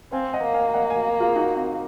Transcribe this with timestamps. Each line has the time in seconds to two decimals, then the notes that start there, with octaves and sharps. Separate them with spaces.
0.12 C4 F5 G#5
0.33 D#5 F#5
0.44 A#3
0.54 F5 G#5
0.69 F5
0.74 D#5 F#5
0.90 F5 G#5
1.20 F4 G#4
1.36 D#4 F#4
1.56 C4